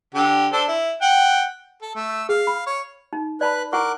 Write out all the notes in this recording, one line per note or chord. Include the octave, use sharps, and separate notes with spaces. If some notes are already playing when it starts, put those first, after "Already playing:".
D3 G4
D4 A4 C5
E4
F#5 G5
A4
A3 E6
G#4 F5
B5
C#5
D#4
B4 D5 A5 B5 F#6
E4 A#4 F#5 C#6 D6 F#6